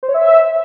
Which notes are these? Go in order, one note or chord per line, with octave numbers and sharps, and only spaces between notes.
C5
C#5
E5